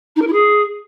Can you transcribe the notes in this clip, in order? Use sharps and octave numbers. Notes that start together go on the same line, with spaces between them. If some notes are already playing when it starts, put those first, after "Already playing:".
D#4
A#4
E4
G#4